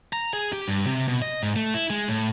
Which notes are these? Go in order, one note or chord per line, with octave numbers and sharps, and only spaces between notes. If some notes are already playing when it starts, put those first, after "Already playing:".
A#5
G#4
G4
G2
C3
B2
D#5
G#2
A3
E4
G#3
A2